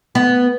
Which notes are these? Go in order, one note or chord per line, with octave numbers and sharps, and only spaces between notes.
B3